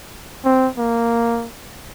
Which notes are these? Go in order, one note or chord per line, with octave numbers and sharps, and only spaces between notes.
C4
A#3